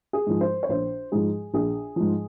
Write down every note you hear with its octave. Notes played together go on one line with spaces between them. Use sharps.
G#4
G#2 F3
C5
C#5
A#1 C5
G#2 F3 G#4
A#1 G#4
G#2 F3